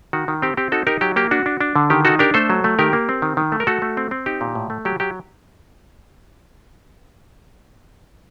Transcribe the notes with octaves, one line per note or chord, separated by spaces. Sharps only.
D#3 F#4
D#3
C4 G4
C4 G4
D#4 F#4 A4
D#4 G4 A#4
F#3 G4
A#3 G4
D4 F#4
D4
D4
D3
D#3 G4
D#4 F#4 A4
D4 G4 A#4
A3 A4 C5
F#3
A3
D#3 G4 A#4
A#3
C4
D#3
D#3
A3
A#4
A3 F#4 A4
A3
C4
C4
D#4 G4
A#2
A2
A3
F#3 G4
F#3 G4